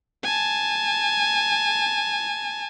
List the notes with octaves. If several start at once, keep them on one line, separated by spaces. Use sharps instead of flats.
G#5 A5